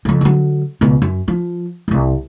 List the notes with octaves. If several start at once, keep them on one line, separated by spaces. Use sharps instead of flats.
F2 C#3
D3 F#3
C#2 B2
F#2
F3
D#1 C2